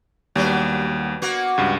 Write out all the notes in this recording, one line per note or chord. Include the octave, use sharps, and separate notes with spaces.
D#2 F#3 G3 B3 D4
A#3 B3 F#4
C#2 G2